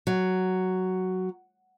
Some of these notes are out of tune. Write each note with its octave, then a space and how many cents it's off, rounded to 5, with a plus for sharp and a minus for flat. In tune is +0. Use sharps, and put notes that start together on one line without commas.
F#3 +5